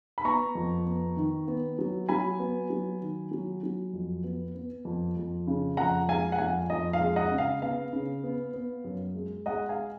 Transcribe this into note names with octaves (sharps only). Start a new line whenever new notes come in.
B5
B3 A#5 C#6
F2
B3
D#3
B3
F#3
F#3 G#5 B5
B3
F#3
D#3
F#3
F#3
F2
B3
B3
F2
F2
C#3
F2 F#5 A#5
G#3 F5 G#5
F#5
F2 F5 G#5
F2 D#5
F5
G#3
D#5 F#5
C#3
F5
B3 F5
C#3
B3
B3
F#2
G#3
G#3 D#5 F#5
F5 G#5